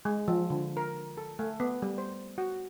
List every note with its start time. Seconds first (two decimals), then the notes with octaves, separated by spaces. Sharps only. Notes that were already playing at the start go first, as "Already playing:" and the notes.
0.05 G#3
0.28 F3
0.50 D3
0.77 A#4
1.17 A4
1.39 A3
1.60 B3
1.82 G3
1.98 C5
2.38 F#4